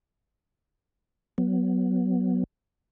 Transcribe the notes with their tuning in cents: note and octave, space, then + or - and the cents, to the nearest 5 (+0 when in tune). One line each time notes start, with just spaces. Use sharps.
F#3 +10 B3 +0